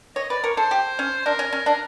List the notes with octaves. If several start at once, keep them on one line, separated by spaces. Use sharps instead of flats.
C#5 D#5
B4 D5
A#4 C#5
A4 C5
G4
C#4
D4 A#4
C#4
C#4
D4